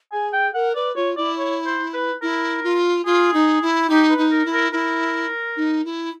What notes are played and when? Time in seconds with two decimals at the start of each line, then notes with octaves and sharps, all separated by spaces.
0.12 G#4 G#5
0.33 G5
0.54 A#4 F#5
0.75 B4 D5
0.96 F4 C#5
1.17 E4 D5
1.38 C#5
1.66 C5
1.94 B4
2.22 E4 A#4
2.64 F4
3.05 F4 G#4
3.34 D#4
3.62 E4
3.90 D#4 G4
4.10 B4
4.18 D#4
4.31 A#4
4.45 E4
4.52 A#4
4.72 E4 A#4
5.56 D#4
5.85 E4